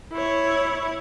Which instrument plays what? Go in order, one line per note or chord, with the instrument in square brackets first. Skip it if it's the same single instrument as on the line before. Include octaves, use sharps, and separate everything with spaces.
[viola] E4 C#5